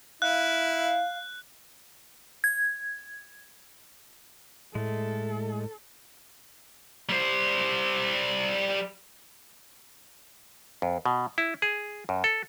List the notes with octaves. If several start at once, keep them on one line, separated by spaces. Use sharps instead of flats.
E4 F5 F#6
G#6
A2 G#3 A3 A4
G3 C5
F2
B2
E4
G#4
F#2
A4